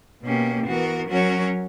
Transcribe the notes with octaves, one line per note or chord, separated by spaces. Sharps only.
B2 A#3 C#4 G4
E3 B3 F#4 A#4
F#3 C#4 F#4 A#4 C#5